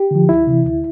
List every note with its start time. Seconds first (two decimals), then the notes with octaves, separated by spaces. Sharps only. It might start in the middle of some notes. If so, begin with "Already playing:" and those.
Already playing: G4
0.11 D3 F3
0.29 D2 E4
0.47 C3 E3
0.65 D2